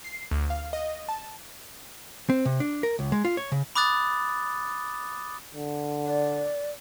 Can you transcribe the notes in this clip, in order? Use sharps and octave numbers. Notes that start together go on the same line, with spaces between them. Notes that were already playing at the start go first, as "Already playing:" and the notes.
C7
D2
F5
D#5
A5
C4
C3
D4
A#4
C#2
G#3
F4
C#5
C#3
B5 D6 D#6 F#6 A6
D3
D5